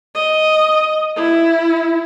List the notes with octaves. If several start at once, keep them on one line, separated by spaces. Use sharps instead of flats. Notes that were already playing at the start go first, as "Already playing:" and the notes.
D#5
E4